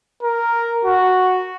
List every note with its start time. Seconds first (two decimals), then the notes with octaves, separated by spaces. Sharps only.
0.23 A#4
0.85 F#4